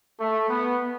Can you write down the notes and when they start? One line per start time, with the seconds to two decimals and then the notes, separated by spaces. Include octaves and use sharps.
0.18 A3
0.49 B3